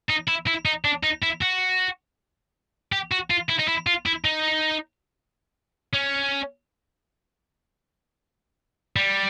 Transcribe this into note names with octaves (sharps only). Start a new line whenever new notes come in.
D#4
E4
E4
D#4
D4
D#4
E4
F#4
G4
F#4
F4
E4
D#4
E4
F4
E4
D#4
C#4
G3